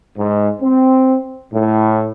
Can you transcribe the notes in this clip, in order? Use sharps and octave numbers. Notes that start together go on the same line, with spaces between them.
G#2
C4
A2